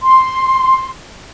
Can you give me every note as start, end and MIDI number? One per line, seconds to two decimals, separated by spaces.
0.01 0.88 84